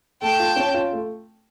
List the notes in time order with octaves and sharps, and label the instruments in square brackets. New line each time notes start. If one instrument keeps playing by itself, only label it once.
[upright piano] A3 [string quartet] G5 A5
[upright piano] F4
C#4
F4
A3